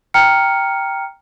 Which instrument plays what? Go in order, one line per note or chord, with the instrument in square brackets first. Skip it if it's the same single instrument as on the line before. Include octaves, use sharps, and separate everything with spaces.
[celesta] G5 A#5 F6 C#7